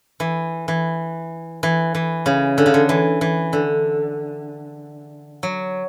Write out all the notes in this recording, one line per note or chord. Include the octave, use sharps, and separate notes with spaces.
E3
E3
E3
E3
C#3
D3
C#3
D3
E3
E3
D3
F#3